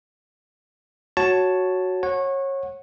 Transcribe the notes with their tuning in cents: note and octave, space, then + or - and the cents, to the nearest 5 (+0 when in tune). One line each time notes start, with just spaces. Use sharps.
F#4 +0 C#5 +0 A5 +0
C#5 -25 F#5 -10